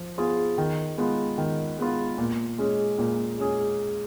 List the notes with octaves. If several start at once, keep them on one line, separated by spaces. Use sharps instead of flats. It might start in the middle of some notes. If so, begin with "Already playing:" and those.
Already playing: F3
B3 F4 G#4
D#3
G#3 B3 F4
D#3
G#3 B3 F4
A#2
G#3 C#4 G#4
A#2
G#3 C#4 G#4